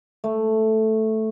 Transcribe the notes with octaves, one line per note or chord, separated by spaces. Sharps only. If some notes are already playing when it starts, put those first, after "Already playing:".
A3